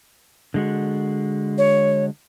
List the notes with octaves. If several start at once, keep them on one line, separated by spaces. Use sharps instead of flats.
D3 G#3 F#4
C#5